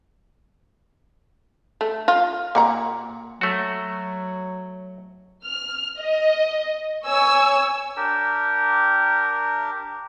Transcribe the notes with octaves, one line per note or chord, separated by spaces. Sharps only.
A3
F4
A#2 A#3 F#5 A#5
F#3 A3 F#4
F6
D#5
C#5 G#5 E6
D4 G4 A#4